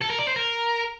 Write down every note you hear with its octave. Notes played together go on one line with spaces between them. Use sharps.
A4
A#4
D5
C5
A#4